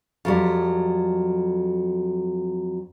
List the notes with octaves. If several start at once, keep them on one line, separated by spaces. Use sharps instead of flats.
F2 F#3 G3